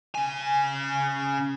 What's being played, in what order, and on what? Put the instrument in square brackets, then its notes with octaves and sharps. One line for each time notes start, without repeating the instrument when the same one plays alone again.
[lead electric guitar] C#3 G#5